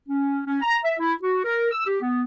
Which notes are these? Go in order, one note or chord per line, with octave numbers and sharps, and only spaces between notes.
C#4
C#4
A#5
E5
E4
F#4
A#4
E6
G4
B3